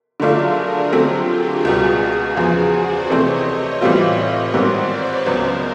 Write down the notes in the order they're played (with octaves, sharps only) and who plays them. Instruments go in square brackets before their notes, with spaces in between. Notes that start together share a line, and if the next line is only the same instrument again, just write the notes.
[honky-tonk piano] D3 F#3 A3 D4 F4 [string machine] G#4 A#4
[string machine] F#4 G#4
[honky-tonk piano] D3 F#3 A3 C4 [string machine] F4 G4
[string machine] F#4 G#4
[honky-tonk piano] C#2 B2 G3
[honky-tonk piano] E2 C#3 F3 [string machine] F#4 G#4
[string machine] C5 D5
[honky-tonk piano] C3 E3 A3 C4 [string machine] C#5 D#5
[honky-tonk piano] A2 E3 G3 C4 F4
[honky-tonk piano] G#2 D#3 G3 C4 [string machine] C5 D5
[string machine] B4 C#5
[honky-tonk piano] C#2 C#3 F#3 B3 [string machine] A#4 C5